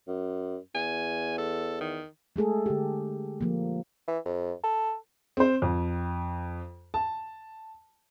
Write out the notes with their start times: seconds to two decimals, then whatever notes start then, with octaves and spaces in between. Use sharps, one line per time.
0.07 F#2
0.75 E2 G#5
1.38 A4
1.81 D#3
2.36 G#3 A3 G#4 A4
2.66 D3 G4
3.41 F3 A#3
4.08 E3
4.25 F2
4.64 A4
5.37 C4 C5
5.62 F2
6.94 A5